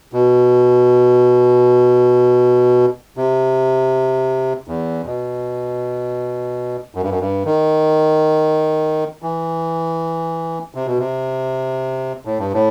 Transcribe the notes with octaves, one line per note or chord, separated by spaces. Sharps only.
B2
C3
E2
B2
F#2
G2
F#2
G2
D#3
E3
C3
B2
C3
A2
G2
A2